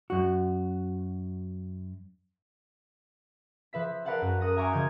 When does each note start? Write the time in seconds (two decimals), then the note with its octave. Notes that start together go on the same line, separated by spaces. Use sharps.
0.10 F#2 F#4
3.73 F3 B4 E5 B6
4.05 A#4 B4 D5 F5 F#5 A5
4.22 F#2
4.41 A#4 F#5 D#6 A#6
4.57 E5 G#5 A#5 C#6 D6 F6
4.73 C#3 F3 D#5 G6 G#6